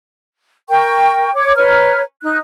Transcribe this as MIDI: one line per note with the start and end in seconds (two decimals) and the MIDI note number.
0.69 1.31 70
0.69 1.31 79
0.69 1.31 85
1.34 1.56 73
1.34 1.56 86
1.56 2.01 71
1.56 2.01 73
1.56 2.01 82
1.56 2.01 89
2.22 2.37 63
2.22 2.37 90